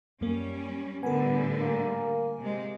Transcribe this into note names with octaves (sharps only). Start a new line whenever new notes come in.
F#2 G3 A#3 C#4
A2 D3 G3 B3 A#4 G#5
A#3
C3 G#3